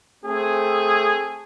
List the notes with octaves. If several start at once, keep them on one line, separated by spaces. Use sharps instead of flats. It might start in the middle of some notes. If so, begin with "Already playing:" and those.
A3 C4 G#4